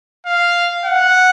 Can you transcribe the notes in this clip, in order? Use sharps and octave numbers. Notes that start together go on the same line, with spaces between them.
F5
F#5